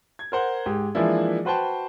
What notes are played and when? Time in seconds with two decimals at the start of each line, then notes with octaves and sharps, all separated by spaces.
0.19 G#6
0.32 A#4 C5 F#5
0.66 G#2 G4
0.95 E3 F3 G#3 A#3 D4 E4
1.45 F#4 B4 C5 G5 A5